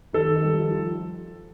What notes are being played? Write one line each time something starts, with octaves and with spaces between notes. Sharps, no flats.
D#3 A4
D#3
G3
F3
F3